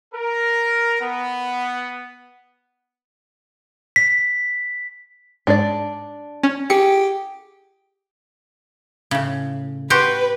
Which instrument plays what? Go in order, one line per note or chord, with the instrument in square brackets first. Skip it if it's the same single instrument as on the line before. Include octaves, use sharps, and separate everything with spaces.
[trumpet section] A#4
B3
[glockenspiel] B6
[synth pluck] G#2 [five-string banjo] D4 D5
[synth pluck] C#4
[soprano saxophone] G4 [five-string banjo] G#4 [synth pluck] C#7
[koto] A2 C#3
[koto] F#4 G4 C5 [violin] B4